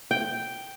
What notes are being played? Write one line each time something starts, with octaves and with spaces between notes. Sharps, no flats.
G5